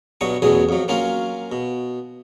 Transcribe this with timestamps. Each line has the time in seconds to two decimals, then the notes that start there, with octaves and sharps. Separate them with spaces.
0.21 G2 B2 F#3 C#6 D#6
0.42 A1 E2 B2 F#3 G#4 D#6
0.69 F2 F#3
0.88 F#3 A#3 C#4 F4
1.52 B2